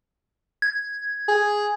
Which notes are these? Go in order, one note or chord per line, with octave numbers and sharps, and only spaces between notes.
G#6
G#4